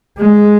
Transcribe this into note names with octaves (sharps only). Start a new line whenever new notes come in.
G#3